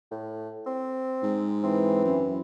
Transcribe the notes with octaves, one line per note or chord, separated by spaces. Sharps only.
A2
C4
G#2
E3 C4
F#2